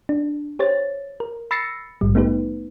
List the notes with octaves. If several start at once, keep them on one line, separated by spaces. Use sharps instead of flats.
D4
G4 C5 C#5 A6
A#4
B5 E6 A6 A#6 C7 C#7
A#1 G#2 G3
A3 B3 D#4 G4 B4